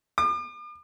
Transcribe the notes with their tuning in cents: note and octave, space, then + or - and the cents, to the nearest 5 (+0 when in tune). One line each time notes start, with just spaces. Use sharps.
D6 +45